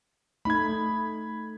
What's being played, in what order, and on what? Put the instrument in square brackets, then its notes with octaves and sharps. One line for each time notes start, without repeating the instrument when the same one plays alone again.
[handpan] A3 D#4 [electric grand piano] B5 G#6